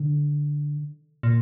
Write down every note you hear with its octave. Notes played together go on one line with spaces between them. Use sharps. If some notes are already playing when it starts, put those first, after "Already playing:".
Already playing: D3
A#2